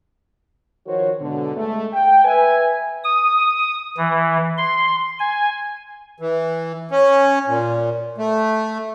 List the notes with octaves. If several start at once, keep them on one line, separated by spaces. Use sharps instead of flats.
D#3 F3 F#4 A#4 C5 C#5
G#2 B2 D3
G#3 A3
G5
B4 E5 G#5
D#6
E3
C6
G#5
E3
C#4
A#2
A3